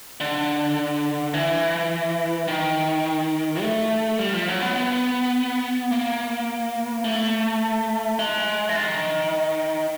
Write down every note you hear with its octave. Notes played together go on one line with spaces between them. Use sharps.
D3
E3
D#3
A3
G3
F3
F#3
B3
B3
A#3
A3
G#3
E3
D#3